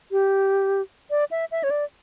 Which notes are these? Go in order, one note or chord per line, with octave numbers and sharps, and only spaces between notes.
G4
D5
E5
E5
C#5
D5